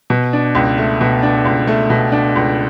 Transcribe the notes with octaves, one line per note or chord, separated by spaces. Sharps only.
B2
D4
C#2
A3
B2
D4
C#2
A3
B2
D4
C#2